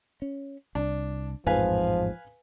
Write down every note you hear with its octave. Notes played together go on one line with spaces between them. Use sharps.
C#4
C2 D4
A1 F2 G#2 F3 B4 F5 G#5